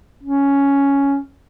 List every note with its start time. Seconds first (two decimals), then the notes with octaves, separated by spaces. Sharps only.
0.23 C#4